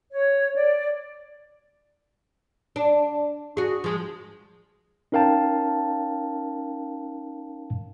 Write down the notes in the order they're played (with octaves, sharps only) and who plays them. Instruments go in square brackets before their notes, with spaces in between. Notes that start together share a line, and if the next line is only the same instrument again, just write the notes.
[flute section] C#5
D5
[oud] D4
F#4 G#4
F3 G#3
[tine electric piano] C#4 D#4 A#4 F5 G5 A5